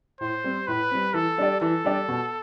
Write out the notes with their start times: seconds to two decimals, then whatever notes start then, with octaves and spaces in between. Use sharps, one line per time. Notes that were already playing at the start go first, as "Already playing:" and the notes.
0.21 A2 C5
0.44 G3 C4
0.67 A2 B4
0.91 G3 C4
1.14 E3 A4
1.38 G3 D4 G4 D5
1.61 E3 A4
1.85 G3 D4 G4 D5
2.08 B2